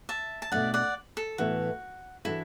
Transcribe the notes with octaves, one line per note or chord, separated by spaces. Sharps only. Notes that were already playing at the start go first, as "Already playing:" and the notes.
E5 A5
A5
B2 A3 D4 D5 F#5
D5 F#5
A4
A2 E3 B3 E4 F#4 A4
E3 D4 E4 F#4 A4